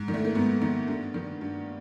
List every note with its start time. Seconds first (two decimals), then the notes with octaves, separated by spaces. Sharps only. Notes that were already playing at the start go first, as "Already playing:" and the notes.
Already playing: G#2
0.08 D#3
0.14 A3
0.25 A#3
0.35 G#2 B3
0.62 D#3
0.88 G2
1.14 D#3
1.41 G2